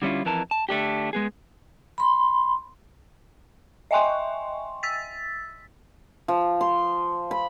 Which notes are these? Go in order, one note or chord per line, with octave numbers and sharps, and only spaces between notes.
D3 G3 C#4 E4 F4
F2 E3 A#4 A5
A5
D3 A3 D4 G4
G#3 B3 G#4
B5 C6
D#5 E5 G5 G#5 C6 C#6
E6 A6 B6
F3
C6
B5